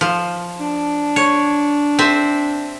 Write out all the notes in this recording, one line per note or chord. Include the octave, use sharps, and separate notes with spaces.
F3
D4
C#5
C4 E5